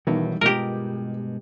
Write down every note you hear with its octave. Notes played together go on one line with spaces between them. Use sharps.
B1 D#3 E3 F#3 G3
G2 B2 G#3 F4 G4 A#4